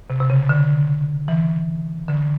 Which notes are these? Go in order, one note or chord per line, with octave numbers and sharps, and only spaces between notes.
C3
C3
C#3
D3
E3
D3